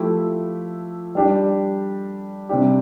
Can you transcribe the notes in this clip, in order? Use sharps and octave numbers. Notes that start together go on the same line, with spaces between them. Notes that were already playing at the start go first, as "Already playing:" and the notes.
Already playing: F3 A3 E4 G4
G3 D4 G4
C3 G3 D4 G4